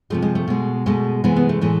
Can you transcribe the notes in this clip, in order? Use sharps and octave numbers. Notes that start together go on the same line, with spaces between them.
C3 F3 G#3 A3
G#3
A3
B2 G#3
B2 G#3 A3
C3 E3 G#3 B3
B3
A3
A2 E3 G#3